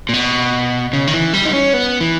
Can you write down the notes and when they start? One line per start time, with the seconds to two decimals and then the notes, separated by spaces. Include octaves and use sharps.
0.09 A#2
0.13 B2
0.93 C#3
1.07 D#3
1.14 E3
1.33 G3
1.45 D#4
1.53 C#4
1.74 B3
2.01 E3